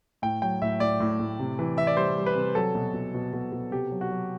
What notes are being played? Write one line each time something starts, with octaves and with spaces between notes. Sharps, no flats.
A2 G5
F#3 G5
A2 E5
A2 D5
A2
A2
C3
E3
E3 E5
D5
G3 C5
G3
B4
C3
F#3 A4
B2
B2
B2
B2
B2
C3 G4
F#3
F#4
F#3